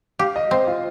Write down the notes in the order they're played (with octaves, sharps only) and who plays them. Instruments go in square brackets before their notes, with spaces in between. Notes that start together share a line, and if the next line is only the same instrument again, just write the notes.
[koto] G4 [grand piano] F5
[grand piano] D#5
[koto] C4 [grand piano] C5
[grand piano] F4